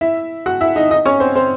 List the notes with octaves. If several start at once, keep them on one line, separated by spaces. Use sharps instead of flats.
E4 E5
F#4 F#5
E4 E5
D#4 D#5
D#4 D#5
C#4 C#5
C4 C5
C4 C5